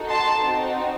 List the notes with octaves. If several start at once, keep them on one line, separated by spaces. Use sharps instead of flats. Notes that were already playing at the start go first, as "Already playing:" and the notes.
Already playing: D#4 F#4 A4
A5 C6
C4 D#4 F#4